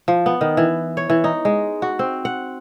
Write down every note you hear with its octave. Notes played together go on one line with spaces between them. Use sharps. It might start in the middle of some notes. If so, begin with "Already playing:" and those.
F3
B3
D#3
E3
C#5
E3
D#4
G#3
F#4
C4
F#5